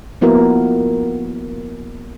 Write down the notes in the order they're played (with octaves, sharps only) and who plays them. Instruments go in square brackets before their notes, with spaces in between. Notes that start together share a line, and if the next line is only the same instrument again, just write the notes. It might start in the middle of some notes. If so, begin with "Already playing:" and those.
[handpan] F3 A#3 B3 E4 F#4 A#4